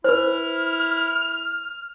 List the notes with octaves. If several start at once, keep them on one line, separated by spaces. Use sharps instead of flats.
E4 B4 C5 F6